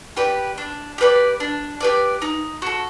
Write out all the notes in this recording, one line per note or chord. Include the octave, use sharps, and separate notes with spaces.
G4 B4 D5
D4
G4 B4 D5
D4
G4 B4 D5
D#4
F#4 A4